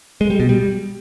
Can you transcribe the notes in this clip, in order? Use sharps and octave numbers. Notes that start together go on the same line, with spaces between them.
G#3
G3
B2
G3